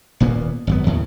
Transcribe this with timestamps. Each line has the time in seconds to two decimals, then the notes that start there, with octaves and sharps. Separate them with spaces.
0.20 D#1 A#2 A#3 B3
0.67 G#1 F#2 B3
0.86 D#2 A2 C#3